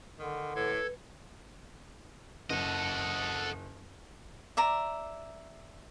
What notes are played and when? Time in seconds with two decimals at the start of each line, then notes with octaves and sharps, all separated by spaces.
0.19 D3 D#3
0.56 A2 A4 B4 G#6
2.50 F#1 A4 D#5 F#5
4.57 D5 E5 A#5